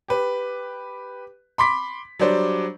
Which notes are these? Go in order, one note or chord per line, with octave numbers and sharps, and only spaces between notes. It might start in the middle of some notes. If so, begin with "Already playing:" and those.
G4 B4
B5 C6 D6 B6
F#3 G3 D4 C5 D5